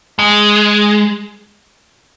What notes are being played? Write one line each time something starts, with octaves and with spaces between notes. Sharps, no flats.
G#3